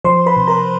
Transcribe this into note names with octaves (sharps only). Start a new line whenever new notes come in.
F3 C5 C6
B4 B5
C3
A#4 A#5